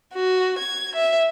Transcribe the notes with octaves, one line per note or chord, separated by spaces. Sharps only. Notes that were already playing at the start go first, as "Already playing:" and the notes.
F#4
G#6
E5